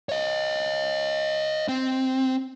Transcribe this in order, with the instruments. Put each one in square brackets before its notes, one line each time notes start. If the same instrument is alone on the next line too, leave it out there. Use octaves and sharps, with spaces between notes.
[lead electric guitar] C#5 D#5
C4